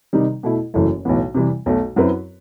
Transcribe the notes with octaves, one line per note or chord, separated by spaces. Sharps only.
C3 D#3 G3 D#4
B2 A3 E4
F#1 F#2 E3 A3 E4
B1 A2 E3 B3
C3 E3 G3
B1 B2 A3
F#2 F#3 C4 E4 B4